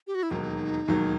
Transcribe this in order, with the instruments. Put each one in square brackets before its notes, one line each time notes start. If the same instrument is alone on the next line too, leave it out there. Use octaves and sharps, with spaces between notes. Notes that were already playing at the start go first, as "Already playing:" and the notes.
[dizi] G4
F#4
E4
[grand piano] E1 D#2 D#3 F#3 [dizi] D#4
[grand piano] E1 D#2 D#3 F#3